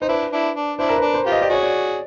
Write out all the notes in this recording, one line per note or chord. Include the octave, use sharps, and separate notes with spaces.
D#4 C5
D4 E4 B4
D4 E4
D4
D4 E4 C5
A#4
B4
D4
C5
F4 G4
D#5
G4 D5
F#4 G#4 C#5
D5